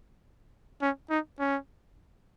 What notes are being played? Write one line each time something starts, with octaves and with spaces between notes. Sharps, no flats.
C#4
D#4
C#4